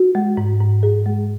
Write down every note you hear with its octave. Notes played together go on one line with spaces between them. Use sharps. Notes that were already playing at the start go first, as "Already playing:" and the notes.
Already playing: F#4
G#3
G#2
G#2
G#2 G#4
G#3